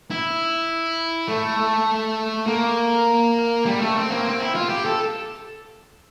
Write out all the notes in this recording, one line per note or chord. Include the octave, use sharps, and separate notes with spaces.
E4
A3
A#3
G3
A3
C4
A#3
C4
E4
F4
G4
A4